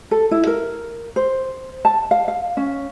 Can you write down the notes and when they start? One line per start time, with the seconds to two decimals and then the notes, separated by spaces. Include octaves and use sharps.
0.11 A4
0.31 E4
0.47 A#4
1.16 C5
1.85 A5
2.11 F5
2.28 F5
2.57 C#4